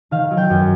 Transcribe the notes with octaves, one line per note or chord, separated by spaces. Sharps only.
D#3 F5
F#3
G5
F#2